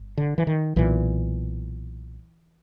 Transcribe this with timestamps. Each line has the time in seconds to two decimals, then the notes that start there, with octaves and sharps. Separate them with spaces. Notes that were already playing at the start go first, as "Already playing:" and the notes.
Already playing: G1
0.17 D3
0.38 E3
0.47 D#3
0.76 B1 A#2 E3